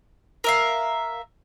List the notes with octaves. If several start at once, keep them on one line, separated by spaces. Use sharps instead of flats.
A#4 E5 F5